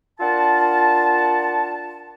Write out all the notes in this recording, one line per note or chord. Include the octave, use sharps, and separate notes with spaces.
D4 F4 A#4 F#5 A5